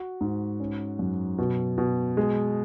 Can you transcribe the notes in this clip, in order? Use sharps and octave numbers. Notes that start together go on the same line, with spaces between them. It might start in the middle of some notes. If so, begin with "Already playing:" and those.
Already playing: F#4
G#2
C#4
F#2
B2
B2
G#3